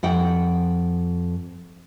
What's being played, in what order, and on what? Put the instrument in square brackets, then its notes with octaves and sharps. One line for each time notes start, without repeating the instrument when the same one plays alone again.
[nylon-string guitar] F2 F#5 G5